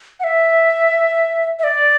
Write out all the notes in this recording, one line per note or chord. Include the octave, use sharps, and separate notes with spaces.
F#5
E5
E5
D5